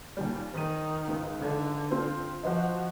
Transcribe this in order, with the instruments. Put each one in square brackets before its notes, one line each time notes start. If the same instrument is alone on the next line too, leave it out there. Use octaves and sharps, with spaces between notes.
[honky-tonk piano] D#2 A#2 G3
[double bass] D#3 [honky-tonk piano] C5 D#7
[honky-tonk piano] C#2 G#2
[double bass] D3
[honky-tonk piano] C4 F4 C5
[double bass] F3 [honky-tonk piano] F#4 C5 D#5